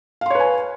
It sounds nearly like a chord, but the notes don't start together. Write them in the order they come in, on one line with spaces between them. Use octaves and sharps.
F5 C6 C#5 B4 G#5